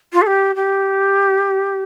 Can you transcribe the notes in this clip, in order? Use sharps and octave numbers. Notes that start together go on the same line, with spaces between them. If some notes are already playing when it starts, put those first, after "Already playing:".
F4
A4
G4
G4